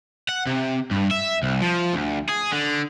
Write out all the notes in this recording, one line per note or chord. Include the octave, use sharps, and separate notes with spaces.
F#5
C3
G2
E5
C2
F3
D2
G#4
D3